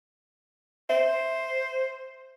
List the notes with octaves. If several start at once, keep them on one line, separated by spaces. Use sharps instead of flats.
C5 E5